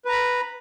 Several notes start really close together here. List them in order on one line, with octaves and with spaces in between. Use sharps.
B4 A#5 B5